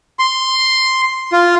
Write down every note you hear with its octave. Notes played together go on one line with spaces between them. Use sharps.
C6
F4